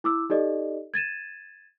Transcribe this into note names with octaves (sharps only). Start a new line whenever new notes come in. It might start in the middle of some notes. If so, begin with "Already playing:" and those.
E4 D6 E6
D#4 G4 A4 D5 D#5
G#6 A6 D#7 E7